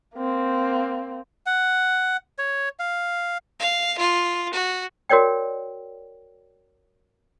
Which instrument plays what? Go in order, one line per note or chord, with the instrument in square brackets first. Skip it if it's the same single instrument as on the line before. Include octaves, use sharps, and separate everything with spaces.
[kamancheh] A#3 C4
[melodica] F#5
C#5
F5
[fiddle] F5
F4
F#4
[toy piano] F#4 A#4 C#5 D5 G5